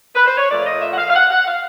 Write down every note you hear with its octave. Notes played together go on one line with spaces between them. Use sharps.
B4
C5
C#5
A#2 F3 A3 D5
D#5
E5
F#5
F5
F5
F#5
F#5
F5